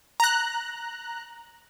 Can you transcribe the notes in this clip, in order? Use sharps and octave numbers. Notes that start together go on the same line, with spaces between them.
A#5 F#6